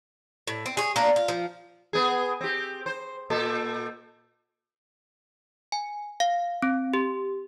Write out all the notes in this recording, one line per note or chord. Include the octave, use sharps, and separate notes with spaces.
A2
C4
G#4 C#5
A#3 C#4 D4
F4
F3
B3 G#4
C4 G4
C5
A#2 A4
G#5
F5
C4
G4